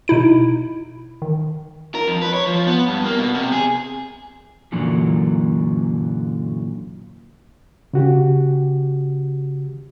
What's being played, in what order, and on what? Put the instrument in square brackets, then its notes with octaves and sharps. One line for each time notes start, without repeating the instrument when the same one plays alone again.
[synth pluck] B2 D#4 E4 D7
D#3
[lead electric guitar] A#4
F2
B4
C#5
F3
B3
G2
A#3
B2
C3
G#4
[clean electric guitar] F#2 A#2 D3 E3 F#3
[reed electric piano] C#3 F#4 G4